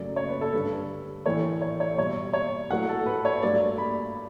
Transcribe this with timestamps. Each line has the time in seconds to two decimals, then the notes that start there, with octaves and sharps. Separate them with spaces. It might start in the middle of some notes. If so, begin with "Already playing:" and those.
Already playing: F#2 C#3 F#3 A3 D5
0.16 C#5
0.29 B4
0.41 A4
0.53 G2 D3 G3 B4
1.26 A2 E3 A3 C#5
1.62 C#5
1.80 C#5
1.97 B2 G3 C#5
2.33 C#5
2.70 A2 F#3 A3 F#5
2.89 A4
3.06 B4
3.25 C#5
3.43 G2 F#3 A3 D5
3.78 B5